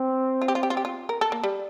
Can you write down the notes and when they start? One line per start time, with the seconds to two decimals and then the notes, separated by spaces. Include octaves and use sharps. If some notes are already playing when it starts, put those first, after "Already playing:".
Already playing: C4
0.42 F4
0.48 G4
0.55 F4
0.63 G4
0.70 F4
0.77 G4
0.85 F4
1.09 A#4
1.21 A4
1.32 A#3
1.44 G3